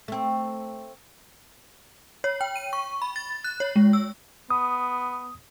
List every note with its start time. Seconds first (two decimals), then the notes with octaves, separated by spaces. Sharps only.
0.08 A3 C4
2.24 C#5
2.41 G5
2.56 D#7
2.73 C#6
3.02 B5
3.16 A6
3.44 F#6
3.60 C#5
3.76 G#3
3.93 E6
4.50 B3 D#6